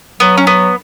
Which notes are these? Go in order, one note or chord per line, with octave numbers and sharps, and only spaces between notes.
F#3 B3
C#4
B3